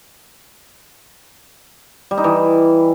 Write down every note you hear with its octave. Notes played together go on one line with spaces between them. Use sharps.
G3
D#4
E3